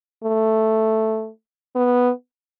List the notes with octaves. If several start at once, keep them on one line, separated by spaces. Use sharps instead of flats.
A3
B3